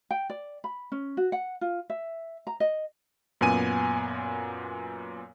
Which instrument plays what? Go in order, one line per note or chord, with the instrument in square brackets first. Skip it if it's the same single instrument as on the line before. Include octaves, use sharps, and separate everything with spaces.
[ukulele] G5
D5
B5
C#4
F#4
F#5
F4
E5
A#5
D#5
[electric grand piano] F#2 A#2 B3 G#5 D#7